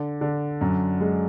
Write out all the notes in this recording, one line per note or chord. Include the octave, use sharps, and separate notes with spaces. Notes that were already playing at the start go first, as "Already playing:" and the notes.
Already playing: D3
D3
F#2
G#3